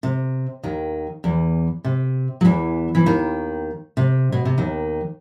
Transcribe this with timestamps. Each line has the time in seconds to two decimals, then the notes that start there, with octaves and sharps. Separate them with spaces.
0.03 C3
0.63 D#2 D#3
1.24 E2 E3
1.84 C3
2.41 F#3
2.45 E2 E3
2.95 E3
3.06 D#2 D#3
3.97 C3
4.32 B2
4.45 C3
4.58 D#2 D#3